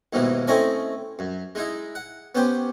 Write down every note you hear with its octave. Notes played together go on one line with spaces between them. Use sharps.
D#2 G#2 B2 D#3 E3
A3 C4 C#4 E4 D#5 G#5
F#2
G#3 D#4 E4
F#5
B3 C#4 G4 C5